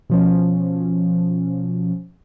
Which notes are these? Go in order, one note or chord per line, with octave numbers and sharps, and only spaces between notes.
B2 F3 C#4